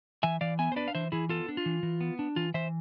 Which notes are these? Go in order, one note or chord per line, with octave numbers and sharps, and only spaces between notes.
E3 E5 G#5
E3 D5 F5
B3 E5 G#5
C5
D4 B4 D5
F5
E3 C5 E5
E3 E4 G#4
B3 F4 A4
D4
F4
E3
E3
B3
D4
E3 F4
E3 C5 E5